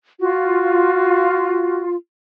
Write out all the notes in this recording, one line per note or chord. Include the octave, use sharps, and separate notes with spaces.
F4 F#4